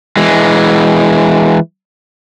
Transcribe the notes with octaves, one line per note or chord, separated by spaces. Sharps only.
E3 G#3